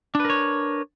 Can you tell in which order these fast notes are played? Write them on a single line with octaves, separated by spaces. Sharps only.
D4 B4 A#4 C#5